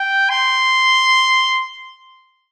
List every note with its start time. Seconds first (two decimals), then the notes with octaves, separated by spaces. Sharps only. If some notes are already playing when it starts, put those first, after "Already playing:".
Already playing: G5
0.29 C6